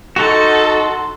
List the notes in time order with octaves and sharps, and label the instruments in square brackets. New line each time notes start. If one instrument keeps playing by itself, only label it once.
[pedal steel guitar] D#4 F#4 [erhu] A4 [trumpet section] F#5 C6